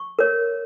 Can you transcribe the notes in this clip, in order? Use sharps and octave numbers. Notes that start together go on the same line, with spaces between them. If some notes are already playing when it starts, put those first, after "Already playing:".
Already playing: C#6
A#4 C#5